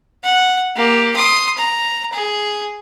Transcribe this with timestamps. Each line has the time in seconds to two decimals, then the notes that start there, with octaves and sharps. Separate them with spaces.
0.24 F#5
0.76 A#3 G4
1.16 C6 D#6
1.57 A#5
2.13 G#4